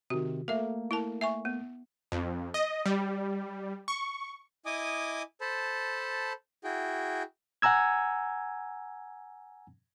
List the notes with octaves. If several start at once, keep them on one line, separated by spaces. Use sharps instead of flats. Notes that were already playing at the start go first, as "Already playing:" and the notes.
C3 D#3 F#4
A3 A#3 A4 E5
E4 A#4 A5
E5 G#5 C#6
B3
F2
D#5
G3
C#6
E4 D#5 G#5 D6 D#6
A4 C5 A5 B5
E4 F#4 G#4 G5
F#5 G#5 A#5 E6 G#6